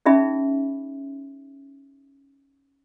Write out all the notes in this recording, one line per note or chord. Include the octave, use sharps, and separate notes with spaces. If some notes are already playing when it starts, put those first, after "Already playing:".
C#4 D#4 G#4 E5 B5